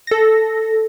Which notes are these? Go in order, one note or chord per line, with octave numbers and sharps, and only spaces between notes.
A4 A#6